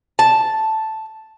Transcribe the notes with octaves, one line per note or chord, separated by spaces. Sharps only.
A5